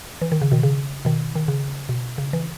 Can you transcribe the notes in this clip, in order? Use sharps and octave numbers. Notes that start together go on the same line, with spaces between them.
E3
D#3
C#3
B2 D#3
C#3
B2 D#3
D#3
C#3
B2
C#3
E3